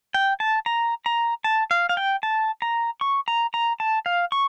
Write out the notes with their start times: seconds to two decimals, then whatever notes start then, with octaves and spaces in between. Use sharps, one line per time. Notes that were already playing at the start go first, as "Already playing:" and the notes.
0.14 G5
0.40 A5
0.66 A#5
1.06 A#5
1.44 A5
1.71 F5
1.89 F5
1.97 G5
2.23 A5
2.62 A#5
3.01 C#6
3.28 A#5
3.54 A#5
3.80 A5
4.06 F5
4.32 C#6